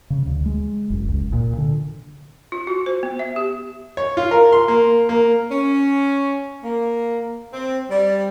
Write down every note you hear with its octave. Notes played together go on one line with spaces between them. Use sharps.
C#3
D2
G#3
F#1
C#2
A#2
D3
F4
F#4
C5
B3
E5
G4
C#5
F4
A#4
C6
A#3
A#3
C#4
A#3
C4
G3